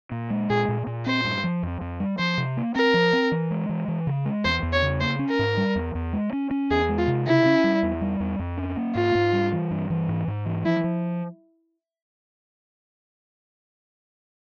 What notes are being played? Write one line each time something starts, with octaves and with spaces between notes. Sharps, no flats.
A#2
G#3
A#2 G#4
A#2
A#2
C4 C5
G2
F3
F2
F2
G3
F3 C5
C3
A#3
C4 A#4
F3
C4
E3
G#3
E3
E3
C#3
G#3
E2 C5
E2
C#5
C#3
A#3 C5
C#4
A#4
G#2
G3
E2
E2
G#3
C#4
C#4
E2 G#4
G#3
F4
C3
C#3 E4
C#4
G3
E2
G3
E2
F2
C#4
A#3
G#2 F4
G#2
G3
E3
G2
E3
G#2
G#2
E3
F3 E4
F3